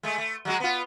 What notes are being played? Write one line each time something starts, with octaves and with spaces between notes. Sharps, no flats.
G#3 A3
A3
F#3 G#3 F#4
B3 F4